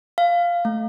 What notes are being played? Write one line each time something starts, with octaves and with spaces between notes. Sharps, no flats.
F5
A3